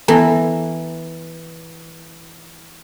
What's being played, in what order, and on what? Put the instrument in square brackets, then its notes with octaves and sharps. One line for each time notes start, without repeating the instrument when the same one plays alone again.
[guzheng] E3 [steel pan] B3 A4 A#5